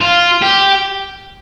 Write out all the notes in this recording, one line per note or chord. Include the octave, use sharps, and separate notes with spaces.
F4
G4